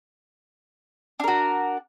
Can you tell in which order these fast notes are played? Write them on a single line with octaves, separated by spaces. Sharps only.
D4 A#4 F#4